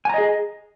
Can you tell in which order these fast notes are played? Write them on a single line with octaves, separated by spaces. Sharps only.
G#5 A#5 D#5 G#4